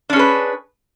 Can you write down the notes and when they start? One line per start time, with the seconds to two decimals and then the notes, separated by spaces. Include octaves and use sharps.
0.10 D4
0.13 C#4
0.16 G#4
0.19 B4